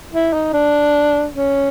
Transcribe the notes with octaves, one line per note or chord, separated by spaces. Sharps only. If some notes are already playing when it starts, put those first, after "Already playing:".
E4
D#4
D4
C#4